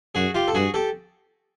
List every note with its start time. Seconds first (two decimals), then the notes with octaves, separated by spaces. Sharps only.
0.15 F#2 F#4 G#4
0.34 F4 G4
0.48 A4
0.54 G2 F#4 G#4
0.74 G4 A4